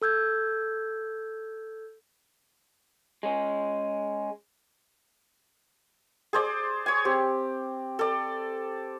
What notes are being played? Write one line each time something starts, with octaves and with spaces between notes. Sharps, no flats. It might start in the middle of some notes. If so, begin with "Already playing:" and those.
A4 E6 G6 G#6
G#3 C#4
G#4 C5 D5
C#5 G#5
C4 G4
A4 D5